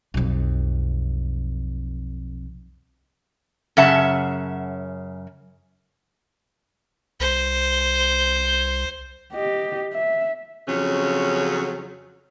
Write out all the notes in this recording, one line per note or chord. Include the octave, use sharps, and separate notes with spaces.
B1 F2
F#2 C#3 E5 F#5 A5
C2 C5
G4 D#5
E5
F2 C#3 F#3 C#4